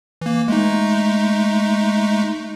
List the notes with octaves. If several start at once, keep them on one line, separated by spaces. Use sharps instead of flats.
E3 A#3
G#3 A3 D#4